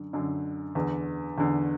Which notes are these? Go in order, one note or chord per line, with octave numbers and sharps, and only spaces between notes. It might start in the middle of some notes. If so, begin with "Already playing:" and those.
Already playing: F#2 D3
F#2 D3
E2 D3
E2 D3